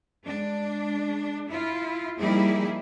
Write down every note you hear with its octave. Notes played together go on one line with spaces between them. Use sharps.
G#3 D4
E4 F4
F3 G3 A#3 D#4 E4 G#4